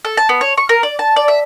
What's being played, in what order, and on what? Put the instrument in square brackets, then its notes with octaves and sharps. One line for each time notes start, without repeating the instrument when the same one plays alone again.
[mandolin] A4
A5
B3
C#5
C#6
A#4
D5
A5
D5
E5